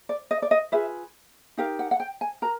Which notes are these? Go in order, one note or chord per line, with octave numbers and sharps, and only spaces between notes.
D5
D#5
D5
D#5
F4 G#4 B4 E5
D#4 G4 A#4 F5
F#5
F#5
G5
G#5
F#4 A#4 A#5